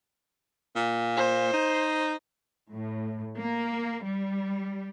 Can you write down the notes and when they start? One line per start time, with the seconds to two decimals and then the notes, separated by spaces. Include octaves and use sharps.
0.76 A#2
1.17 C5
1.53 D#4
2.71 A2
3.38 A#3
4.05 G3